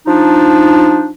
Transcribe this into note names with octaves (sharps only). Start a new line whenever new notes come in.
F3 D4 D#4